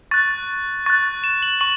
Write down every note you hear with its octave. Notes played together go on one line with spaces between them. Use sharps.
C#6 F#6 A6
C#6 F#6 A6
E7
F#7
C#6 F#7